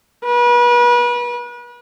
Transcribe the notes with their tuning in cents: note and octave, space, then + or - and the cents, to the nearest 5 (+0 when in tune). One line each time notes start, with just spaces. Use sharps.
B4 -35